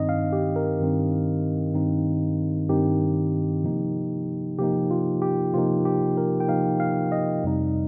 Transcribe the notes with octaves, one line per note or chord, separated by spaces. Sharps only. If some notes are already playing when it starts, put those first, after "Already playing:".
Already playing: G2 D#3 C4 D#4 D#5
F5
G4
A#4
G2 D#3 C4 D#4
G2 D#3 C4 D#4
G2 D#3 C4 D#4 G4
C3 F3 A#3 D#4
C3 F3 A#3 D#4 G4
F4
G4
C3 F3 A#3 D#4 F4
G4
A#4
G5
C3 F3 A#3 D#4 F5
F5
D#5
F2 C3 G3 D#4